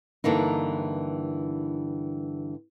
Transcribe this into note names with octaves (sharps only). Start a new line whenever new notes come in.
G2 D3 E3 A#3 D#4